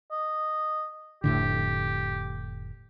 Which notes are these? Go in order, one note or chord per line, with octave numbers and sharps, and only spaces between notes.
D#5
F1 A2 D3 G4